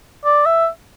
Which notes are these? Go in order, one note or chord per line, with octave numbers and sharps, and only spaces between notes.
D5
E5